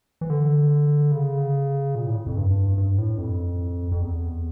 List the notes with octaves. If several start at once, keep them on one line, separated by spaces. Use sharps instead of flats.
E3
D3
C#3
A#2
A2
F2
G2
G2
A2
F2
F2
E2